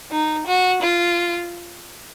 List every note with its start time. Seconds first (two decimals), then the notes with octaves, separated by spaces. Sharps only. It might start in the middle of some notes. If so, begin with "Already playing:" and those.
0.11 D#4
0.47 F#4
0.83 F4